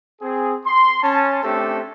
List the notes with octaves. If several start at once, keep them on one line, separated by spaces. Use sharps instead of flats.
C4 G#4
C6
C#4 A5
A3 C4 D4 G4 A4